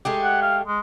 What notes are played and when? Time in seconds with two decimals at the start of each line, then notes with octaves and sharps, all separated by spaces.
0.05 G#3 A3 G4
0.24 F#5
0.42 F5
0.67 G#3